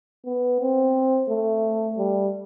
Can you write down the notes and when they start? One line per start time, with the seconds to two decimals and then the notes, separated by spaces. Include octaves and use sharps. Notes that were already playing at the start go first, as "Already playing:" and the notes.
0.26 B3
0.61 C4
1.29 A3
1.98 G3